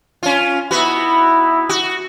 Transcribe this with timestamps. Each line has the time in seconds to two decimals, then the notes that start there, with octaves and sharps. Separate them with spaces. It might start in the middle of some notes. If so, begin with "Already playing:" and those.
0.23 C#4 F4
0.71 B3 D#4 E4 F#4
1.69 F#4